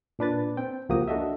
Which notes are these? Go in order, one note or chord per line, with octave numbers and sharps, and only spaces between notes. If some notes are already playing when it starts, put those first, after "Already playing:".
A#2 D4 B4 A6
C4 G5
C#2 F3 A#3 F#4 G4 D#6
D4 F#4 A4 D#5 E5